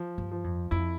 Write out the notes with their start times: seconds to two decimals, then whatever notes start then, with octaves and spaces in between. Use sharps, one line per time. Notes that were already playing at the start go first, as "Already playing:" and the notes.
Already playing: F3
0.18 G2
0.31 F3
0.44 F2
0.71 F2 E4